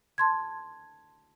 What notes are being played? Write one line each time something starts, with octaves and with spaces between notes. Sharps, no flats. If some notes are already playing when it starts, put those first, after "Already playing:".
A5 C6 G#6